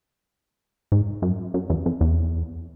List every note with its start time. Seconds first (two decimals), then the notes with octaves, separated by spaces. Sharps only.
0.92 G#2
1.22 F#2
1.54 F#2
1.70 E2
1.86 F2
2.01 E2